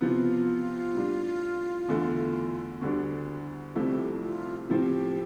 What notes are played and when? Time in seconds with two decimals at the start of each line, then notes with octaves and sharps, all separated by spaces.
0.01 C3 F3 B3 F4
0.94 A2 G3 D4
1.88 E2 D3 A3
2.81 D2 D3 G3 D4
3.75 C2 C3 F3 A3 E4 G4
4.22 F4
4.69 A2 F3 C4 G4